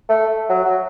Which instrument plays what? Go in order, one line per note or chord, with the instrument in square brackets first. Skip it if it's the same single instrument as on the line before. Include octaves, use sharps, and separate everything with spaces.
[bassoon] A3
F#3
F#3